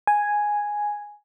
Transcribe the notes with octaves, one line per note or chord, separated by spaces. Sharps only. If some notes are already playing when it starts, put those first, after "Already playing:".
G#5